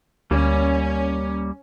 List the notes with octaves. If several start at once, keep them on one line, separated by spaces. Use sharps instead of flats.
D2 G3 A#3 C#4